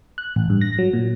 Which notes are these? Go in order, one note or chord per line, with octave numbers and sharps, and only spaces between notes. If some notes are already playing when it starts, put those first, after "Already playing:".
F#6
A1
G2
A#6
F#3
A#2